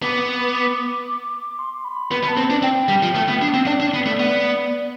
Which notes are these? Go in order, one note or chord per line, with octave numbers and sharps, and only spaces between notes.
B3 D6
C6
B5
B3 B5
B3
A5
C4
D4
C4 G5
G3
F3
A3
B3
D4
C4
D4 D5
D4
B3
A3
B3